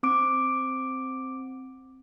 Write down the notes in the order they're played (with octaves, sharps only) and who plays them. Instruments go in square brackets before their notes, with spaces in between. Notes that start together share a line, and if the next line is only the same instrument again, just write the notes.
[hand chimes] C4 D6 D7